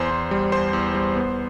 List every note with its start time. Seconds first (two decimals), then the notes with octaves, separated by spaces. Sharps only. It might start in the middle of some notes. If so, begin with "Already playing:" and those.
Already playing: E2 C5 C6
0.11 E2
0.31 G3
0.52 E2 C5 C6
0.73 E2
0.95 G3
1.16 B3